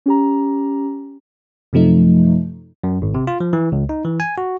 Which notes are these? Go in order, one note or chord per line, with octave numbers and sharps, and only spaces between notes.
C#4 G4 A#5
F#2 C3 F3 A3 D#4
F#2
G#1
C3
F4
F3
E3
C#2
D#4
E3
G#5
F#4